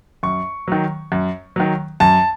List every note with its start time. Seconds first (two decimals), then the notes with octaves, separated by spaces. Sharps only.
0.23 F#2 C#6
0.68 D#3 F#3
1.12 F#2
1.56 D#3 F#3
2.00 F#2 A5